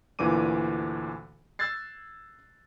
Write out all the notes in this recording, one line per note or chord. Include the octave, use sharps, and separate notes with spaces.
D2 A#2 E3 D4 D6 D#7
E6 F#6 G#6 A6 C7